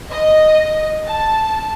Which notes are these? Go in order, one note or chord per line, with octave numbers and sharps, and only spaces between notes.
D#5
A5